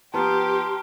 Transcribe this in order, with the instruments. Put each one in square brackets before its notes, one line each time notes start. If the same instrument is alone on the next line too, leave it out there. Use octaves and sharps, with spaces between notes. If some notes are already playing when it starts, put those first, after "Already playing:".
[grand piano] F3 B3 [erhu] G4 [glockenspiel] A5 A#5 F6 [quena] C6